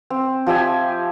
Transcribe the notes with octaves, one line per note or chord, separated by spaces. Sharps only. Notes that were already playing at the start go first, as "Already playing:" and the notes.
C4
F3 G4 E5 G#5